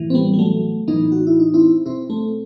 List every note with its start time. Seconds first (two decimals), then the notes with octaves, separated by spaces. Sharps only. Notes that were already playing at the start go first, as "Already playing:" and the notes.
Already playing: A2 E3
0.10 C4
0.14 G3 B3
0.34 G3
0.39 F#3 A3
0.88 A2 E3 B3 D#4
1.12 F#4
1.27 E4
1.40 D#4
1.54 C4 E4
1.86 B2 C4 E4
2.10 A3 C4